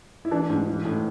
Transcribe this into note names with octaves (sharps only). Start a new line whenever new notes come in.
E4
E3 D4
G#2
E3
A2